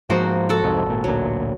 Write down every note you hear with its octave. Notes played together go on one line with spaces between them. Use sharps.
G#2 F3 A#3 F#4 C5
F#4 A4 F#5
C2 F2 G#2
G#1 A#2
A1 D2 A#2 F#3